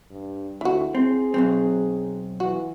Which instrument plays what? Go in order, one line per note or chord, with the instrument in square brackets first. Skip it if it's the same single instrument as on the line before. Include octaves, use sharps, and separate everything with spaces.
[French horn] G2
[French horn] D2 [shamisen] E3 F#4
[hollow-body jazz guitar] C4 [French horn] G#4
[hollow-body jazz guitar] B1 F#3 C4
[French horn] E3 [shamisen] F#4